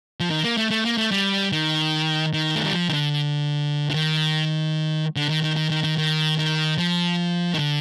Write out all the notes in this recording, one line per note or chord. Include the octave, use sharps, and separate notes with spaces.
F3
D#3
A#3
A3
A3
A#3
A3
G3
D#3
D#3
A3
G3
F3
D#3
D3
D3
D#3
D3
D#3
D#3
D#3
D#3
D#3
D#3
D#3
F3
D#3
D3